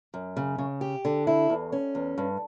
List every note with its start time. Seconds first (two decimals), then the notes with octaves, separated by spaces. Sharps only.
0.14 F#2
0.37 C#3
0.58 C#3
0.81 G4
1.05 D3
1.27 E4
1.50 E2
1.72 C#4
1.95 E2
2.18 G2